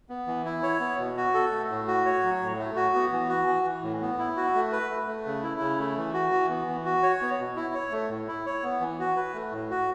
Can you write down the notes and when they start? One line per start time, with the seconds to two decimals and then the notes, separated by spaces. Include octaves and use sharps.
0.09 B3
0.27 E3
0.45 E4
0.63 C#5
0.80 B3
0.99 B2
1.17 F#4
1.34 A4
1.51 A3
1.70 A2
1.87 F#4
2.05 C#5
2.23 F#3
2.41 A2
2.59 A3
2.76 F#4
2.95 B3
3.12 E3
3.29 F#4
3.47 E3
3.65 E3
3.83 A2
4.01 B3
4.19 E4
4.37 F#4
4.55 A3
4.72 B4
4.90 A3
5.08 A3
5.26 C#3
5.43 E4
5.60 C#3
5.79 A3
5.97 E3
6.14 F#4
6.32 E3
6.49 B3
6.67 E3
6.85 F#4
7.03 C#5
7.22 B3
7.39 B2
7.56 E4
7.74 C#5
7.92 A3
8.10 A2
8.27 E4
8.46 C#5
8.63 B3
8.80 E3
8.99 F#4
9.16 B4
9.34 A3
9.52 A2
9.71 F#4